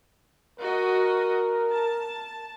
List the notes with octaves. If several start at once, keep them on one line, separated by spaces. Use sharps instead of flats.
F#4 A#4 D#5
A5